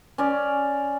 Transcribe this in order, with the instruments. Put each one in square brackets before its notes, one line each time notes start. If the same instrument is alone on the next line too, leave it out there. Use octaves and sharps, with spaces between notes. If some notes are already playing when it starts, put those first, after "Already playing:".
[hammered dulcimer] C#4 D5